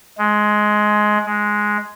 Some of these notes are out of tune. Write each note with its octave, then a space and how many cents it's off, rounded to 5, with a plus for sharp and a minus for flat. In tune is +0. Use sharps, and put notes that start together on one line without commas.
G#3 +15
G#3 +5